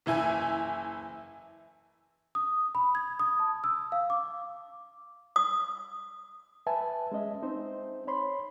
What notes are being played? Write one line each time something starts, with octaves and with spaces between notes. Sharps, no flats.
F#1 E3 E4 G#5
D#6
B5
G#6
D#6
A5
E6
F5
D6
D#6
B4 E5 G#5 A5
G#3 C#4 D#5 E5
C4 D#4 C5
C#5 B5 C6